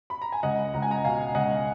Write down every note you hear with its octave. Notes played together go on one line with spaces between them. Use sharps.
B5
A#5
G#5
C#2 D#5 F#5
C#2 A#5
G#5
F#5 A#5
B2 F5 G#5
C#2 D#5 F#5